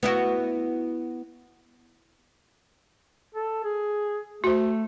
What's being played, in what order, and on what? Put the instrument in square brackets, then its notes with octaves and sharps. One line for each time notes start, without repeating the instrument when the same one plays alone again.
[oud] B3 E4 F#4
[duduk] A4
G#4
[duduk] A3 [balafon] F#4 C5